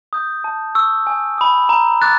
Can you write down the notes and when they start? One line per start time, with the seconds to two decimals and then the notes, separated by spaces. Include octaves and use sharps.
0.13 D#6 G6
0.44 A5
0.75 C#6 E6
1.07 G#5
1.38 B5 D#6
1.69 A#5
2.02 D6 F#6 A6